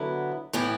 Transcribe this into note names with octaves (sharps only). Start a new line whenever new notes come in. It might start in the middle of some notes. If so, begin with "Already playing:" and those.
Already playing: D3 F#3 B3 E4
A2 E3 B3 E4 G4